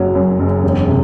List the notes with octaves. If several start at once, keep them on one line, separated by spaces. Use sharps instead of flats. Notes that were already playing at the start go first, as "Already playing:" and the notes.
Already playing: F#1 F#3
F#2
F#1
E1
C3